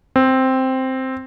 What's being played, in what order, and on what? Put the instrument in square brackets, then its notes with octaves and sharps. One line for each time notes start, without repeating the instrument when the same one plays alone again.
[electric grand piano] C4